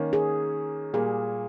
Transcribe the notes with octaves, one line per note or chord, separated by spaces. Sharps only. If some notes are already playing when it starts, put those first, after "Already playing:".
Already playing: D#3 A#3 C#4
G#4
A#2 G3 A#3 G#4